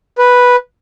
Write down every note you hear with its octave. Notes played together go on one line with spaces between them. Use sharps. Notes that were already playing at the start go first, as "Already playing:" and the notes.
B4